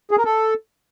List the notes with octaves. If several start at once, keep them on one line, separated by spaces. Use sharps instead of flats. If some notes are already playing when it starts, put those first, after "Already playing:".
G#4
A#4
A4